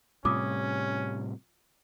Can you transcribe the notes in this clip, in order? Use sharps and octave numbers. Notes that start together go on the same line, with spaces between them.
A2 C3 G3 C#4 F4 D6 D#6